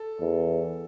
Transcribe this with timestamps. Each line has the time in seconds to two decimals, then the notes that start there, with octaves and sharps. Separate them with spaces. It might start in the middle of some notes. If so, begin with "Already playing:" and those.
Already playing: A4
0.20 E2